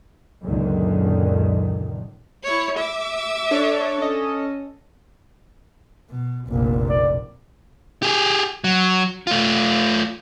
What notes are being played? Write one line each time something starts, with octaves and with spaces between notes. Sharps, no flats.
C#2 F#2 A#2 D3 D#3
E4 C#5
E5 D6
D4 A4 C#5
C#4 A4 D#5
B2
F1 A#1 A#3
D5
G4 G#4
F#3
A3 F4